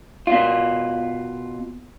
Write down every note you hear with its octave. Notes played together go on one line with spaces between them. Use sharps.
B2 F4